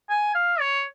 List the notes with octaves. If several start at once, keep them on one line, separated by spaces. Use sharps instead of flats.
G#5
F5
C#5